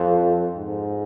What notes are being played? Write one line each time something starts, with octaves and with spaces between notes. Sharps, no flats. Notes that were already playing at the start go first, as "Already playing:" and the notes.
Already playing: F2
G#2